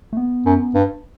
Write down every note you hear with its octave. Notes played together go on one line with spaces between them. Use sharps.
A3
B3
F#2
G2